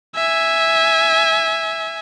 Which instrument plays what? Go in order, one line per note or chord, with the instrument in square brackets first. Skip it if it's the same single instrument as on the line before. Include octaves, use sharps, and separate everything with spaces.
[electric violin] E5 G#5